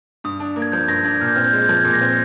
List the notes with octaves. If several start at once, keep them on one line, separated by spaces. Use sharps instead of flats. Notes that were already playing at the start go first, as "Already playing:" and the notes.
G2 D#6
D4
A#3
G#6
F3 G6
G2 A#6
D4 G#6
A#2 F6
G6
C4 F6
G6
G#3
G6
F3 G#6
A#2 G#6
A#6
C4